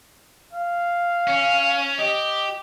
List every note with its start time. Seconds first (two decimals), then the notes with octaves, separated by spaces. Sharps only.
0.53 F5
1.27 C#4
1.99 G4 D#5